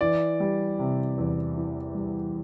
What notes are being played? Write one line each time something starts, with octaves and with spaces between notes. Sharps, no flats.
E3 D5
G3
C3
E2
E3
G3